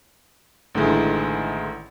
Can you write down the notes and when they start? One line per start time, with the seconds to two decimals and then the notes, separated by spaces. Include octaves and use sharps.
0.75 A1 D3 D#3 G#3 E4